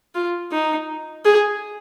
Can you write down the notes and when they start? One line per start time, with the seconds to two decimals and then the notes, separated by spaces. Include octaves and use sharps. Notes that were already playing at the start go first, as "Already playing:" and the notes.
0.15 F4
0.52 D#4
1.25 G#4